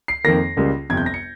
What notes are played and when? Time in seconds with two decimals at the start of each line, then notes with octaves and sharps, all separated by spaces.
0.08 C7
0.24 F2 D#3 A#3 A#6
0.57 C#2 C#3 G3 A#3
0.90 G1 F2 C3 G#6
0.97 G6
1.06 A#6
1.14 C#7